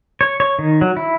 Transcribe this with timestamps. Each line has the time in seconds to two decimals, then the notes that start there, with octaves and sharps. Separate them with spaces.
0.21 C#5
0.40 C#5
0.59 D#3
0.81 F#3
0.97 E4